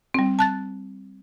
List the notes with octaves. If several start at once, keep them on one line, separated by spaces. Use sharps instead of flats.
G3 C4
A5 F#6 A6